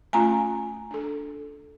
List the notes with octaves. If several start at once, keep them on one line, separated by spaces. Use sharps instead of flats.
A3 C#4 F4 G#5 A#5
D4 A4